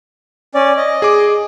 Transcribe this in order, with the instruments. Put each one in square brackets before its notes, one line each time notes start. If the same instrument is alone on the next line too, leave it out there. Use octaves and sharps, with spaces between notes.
[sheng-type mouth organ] C#4 D5
D#5
[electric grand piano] G#4 D6